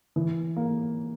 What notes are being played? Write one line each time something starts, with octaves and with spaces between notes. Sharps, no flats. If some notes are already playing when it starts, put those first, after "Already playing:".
E3
A#3